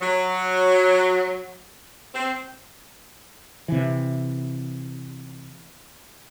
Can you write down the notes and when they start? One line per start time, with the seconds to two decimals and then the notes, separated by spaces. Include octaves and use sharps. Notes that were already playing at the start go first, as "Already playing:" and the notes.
0.01 F#3
2.15 C4
3.68 C3 E3